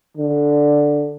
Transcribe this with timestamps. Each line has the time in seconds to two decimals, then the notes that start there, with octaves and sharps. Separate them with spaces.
0.17 D3